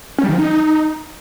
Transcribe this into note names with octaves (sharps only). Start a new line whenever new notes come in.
C#4
G3
D#3
F3
D#4